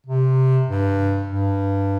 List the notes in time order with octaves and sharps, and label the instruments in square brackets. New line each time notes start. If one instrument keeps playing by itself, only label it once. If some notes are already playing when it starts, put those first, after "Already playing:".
[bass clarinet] C3
G2
G2